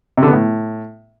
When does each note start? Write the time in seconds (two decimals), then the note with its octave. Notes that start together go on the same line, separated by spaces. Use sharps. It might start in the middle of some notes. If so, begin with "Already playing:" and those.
0.17 C3
0.23 D3
0.28 B3
0.33 A2